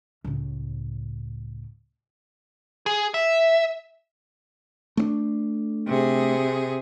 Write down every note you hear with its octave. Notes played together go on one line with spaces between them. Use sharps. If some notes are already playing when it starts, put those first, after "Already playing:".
C#2 A2
G#4
E5
A3 C4 D4
C3 G#4